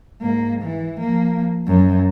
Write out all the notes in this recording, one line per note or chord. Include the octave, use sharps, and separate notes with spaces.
G#2 A#3
E3
F3 A#3
F#2